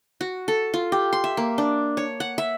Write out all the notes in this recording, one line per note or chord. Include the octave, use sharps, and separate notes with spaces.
F#4
A4
F4
G4
C6
E5
A#3
D4
C#5
F#5
E5